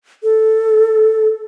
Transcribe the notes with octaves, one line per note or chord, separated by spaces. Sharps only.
A4